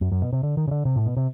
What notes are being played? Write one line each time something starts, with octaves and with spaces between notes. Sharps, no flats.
F#2
F#2
B2
C3
D3
D#3
C#3
D3
C3
A2
B2
C3